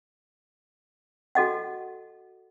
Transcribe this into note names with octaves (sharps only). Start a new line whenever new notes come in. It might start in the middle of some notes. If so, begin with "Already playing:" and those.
F#4 A4 D#5 F#5